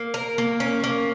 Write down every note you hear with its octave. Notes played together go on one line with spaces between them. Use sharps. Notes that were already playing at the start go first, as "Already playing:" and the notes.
Already playing: A#3
A#4
A#3
C#4
A#3